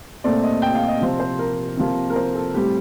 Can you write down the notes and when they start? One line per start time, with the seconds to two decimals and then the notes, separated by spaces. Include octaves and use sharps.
0.24 A#2 A3 C4 D5
0.43 D#5
0.62 G5
0.75 F5
0.88 D#5
1.00 C3 F3 C4
1.20 C5
1.39 A#4
1.77 C3 F3 A#3
2.10 A#4
2.16 C5
2.35 A4
2.54 A2 G3 C4 G4